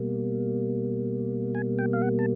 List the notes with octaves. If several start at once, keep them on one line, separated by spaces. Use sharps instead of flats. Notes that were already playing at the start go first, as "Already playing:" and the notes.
Already playing: B2 G3 A#3
G#5
G5
F5
F#5
A5